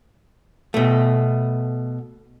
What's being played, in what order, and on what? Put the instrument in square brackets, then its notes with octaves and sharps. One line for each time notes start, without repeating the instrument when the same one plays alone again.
[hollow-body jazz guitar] B2 A3